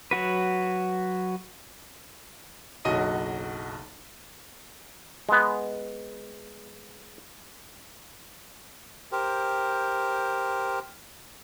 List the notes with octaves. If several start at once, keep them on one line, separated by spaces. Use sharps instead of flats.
F#3 F#4 B4
F#1 B1 F#4 D#5 D#7
G#3 B3
G4 A#4 C5